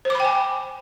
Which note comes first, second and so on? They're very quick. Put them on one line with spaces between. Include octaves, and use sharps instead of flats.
C5 D6 B5 G5 G#5